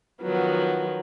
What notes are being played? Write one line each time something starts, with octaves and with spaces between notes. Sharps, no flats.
D#3 F3 F#3 B3